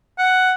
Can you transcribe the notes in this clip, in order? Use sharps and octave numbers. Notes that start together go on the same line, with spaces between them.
F#5